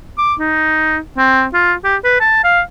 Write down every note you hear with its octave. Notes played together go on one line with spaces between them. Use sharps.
D6
D#4
C4
F4
G4
B4
A5
F5